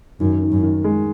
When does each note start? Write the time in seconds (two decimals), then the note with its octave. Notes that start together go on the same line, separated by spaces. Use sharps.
0.20 F#2 D#3
0.42 D#3
0.52 F#2
0.63 D#3
0.84 G#3